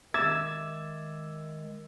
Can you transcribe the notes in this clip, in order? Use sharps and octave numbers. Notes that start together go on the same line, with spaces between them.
D#3 G#3 E5 D6 E6 G#6 A6 E7